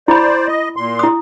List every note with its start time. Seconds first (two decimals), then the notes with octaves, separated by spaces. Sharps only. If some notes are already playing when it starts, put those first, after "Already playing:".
0.08 E4 C5 D5 B5
0.47 D#5
0.76 A#2 C6
0.99 E4 D#6